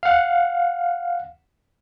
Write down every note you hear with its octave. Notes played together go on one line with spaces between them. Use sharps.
F5 F#5